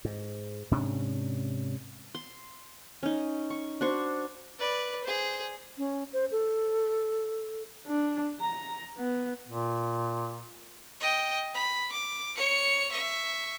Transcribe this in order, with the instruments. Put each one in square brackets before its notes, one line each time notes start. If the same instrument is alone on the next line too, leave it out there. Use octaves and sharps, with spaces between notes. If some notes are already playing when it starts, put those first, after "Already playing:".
[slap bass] G#2
G#2 C3 C#4 D4
[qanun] C6
C#4 D#4
C#6
D4 F#4 C5 C#6
[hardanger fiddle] B4 D5
G#4 C5
[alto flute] C#4
C5
A4
[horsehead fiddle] D4
A#5
B3
[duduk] A#2
[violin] D#5 G5
B5
D6
C#5 C#7
E5 C#6